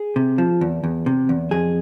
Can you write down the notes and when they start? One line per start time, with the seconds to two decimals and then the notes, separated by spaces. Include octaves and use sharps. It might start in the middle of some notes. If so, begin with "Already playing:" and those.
Already playing: G#4
0.16 C3
0.38 F3
0.61 E2
0.84 E2
1.06 C3
1.29 E2
1.51 F2 G#4